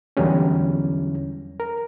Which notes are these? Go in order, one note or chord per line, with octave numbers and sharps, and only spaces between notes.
E2 D3 F#3 G3 C#4
A#4